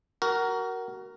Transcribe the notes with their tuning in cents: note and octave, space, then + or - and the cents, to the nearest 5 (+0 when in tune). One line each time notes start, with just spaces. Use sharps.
F#4 +25 A#4 +0